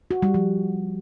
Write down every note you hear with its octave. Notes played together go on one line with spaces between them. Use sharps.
F#4
G3
F3